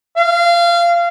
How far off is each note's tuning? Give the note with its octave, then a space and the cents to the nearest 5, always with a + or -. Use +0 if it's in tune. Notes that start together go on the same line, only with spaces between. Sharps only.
F5 -25